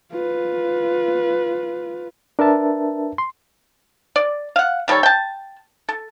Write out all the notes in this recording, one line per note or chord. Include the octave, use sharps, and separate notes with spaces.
F4 B4
D4 A#4 B4 E5 A5
C6
D5
F5 F#5
D#3 G3 A4 C#5
G5 A5
A4